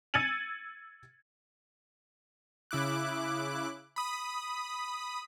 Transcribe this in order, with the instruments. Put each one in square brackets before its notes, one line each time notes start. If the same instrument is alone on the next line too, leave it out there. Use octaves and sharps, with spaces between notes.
[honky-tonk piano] E6 G#6 A6 C#7 D#7 F#7
[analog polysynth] C#3 E4 D6 F#6
B5 D#6